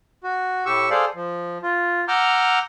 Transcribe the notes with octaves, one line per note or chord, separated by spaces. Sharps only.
F#4
A2 G4 C#6 E6
G#4 A4 C5 D5 F5
F3
F4
F#5 A#5 D6 E6 F6 G6